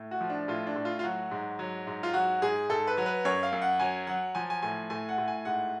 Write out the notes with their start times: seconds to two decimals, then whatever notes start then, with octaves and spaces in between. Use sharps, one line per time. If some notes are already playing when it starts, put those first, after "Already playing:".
Already playing: A2
0.11 F#4
0.21 F3
0.30 D4
0.48 A2 F4
0.67 D4
0.76 A2
0.85 F4
0.99 F4
1.04 F#3 F#4
1.31 G#2
1.59 F#3
1.87 G#2
2.03 F4
2.14 F#3 F#4
2.42 G#2 G#4
2.69 G#2 A4
2.87 B4
2.97 F#3
3.06 B4
3.25 F#2 C#5
3.43 F5
3.53 F#2
3.62 F#5
3.79 F#3 G#5
4.07 F#3 F#5
4.35 F3 G#5
4.50 G#5
4.62 A2 G#5
4.90 A2 G#5
5.09 F#5
5.18 A2
5.28 G#5
5.45 G#2 F#5